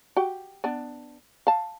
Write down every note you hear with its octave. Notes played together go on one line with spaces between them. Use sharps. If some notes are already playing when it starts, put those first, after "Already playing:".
F#4 G4 G5
B3 D4
F5 A5